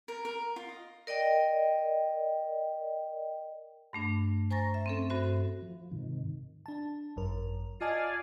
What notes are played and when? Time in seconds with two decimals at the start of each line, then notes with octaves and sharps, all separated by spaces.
0.08 A#4
0.25 A#4
0.56 F4
0.69 D#5
1.07 A#4 D5 D#5 G5
3.93 G2 A3 D4
4.51 C5 G#5 A#5 C#6 A6 A#6
4.74 E5
4.86 C4 C#4 A4
5.10 G2 F#4 C5 E5
5.62 F3
5.92 G#2 C3 D#3
6.66 D4 A5
7.16 G#1 F#2 A#4
7.81 F4 D5 D#5 F5 G#5 A5